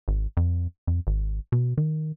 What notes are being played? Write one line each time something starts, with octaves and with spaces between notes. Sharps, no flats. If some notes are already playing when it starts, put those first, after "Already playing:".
G#1
F2
F2
G#1
B2
D#3